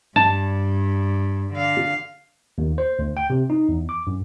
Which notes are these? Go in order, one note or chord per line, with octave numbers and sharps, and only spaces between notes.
G2 A5
D3 F5
D#2
C5
D2
G5
C3
D#4
E2
D6
F#2